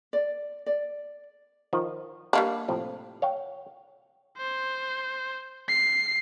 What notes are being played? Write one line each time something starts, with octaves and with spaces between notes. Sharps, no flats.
D5
D5
D#3 F3
G3 A#3 D4
A2 C3 F3
C#5 F5 G5
C5
C7